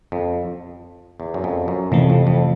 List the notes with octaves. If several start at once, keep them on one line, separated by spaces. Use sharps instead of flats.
F2
E2
F#2
F2
F#2
F2 C3 E3 A3
F2
F2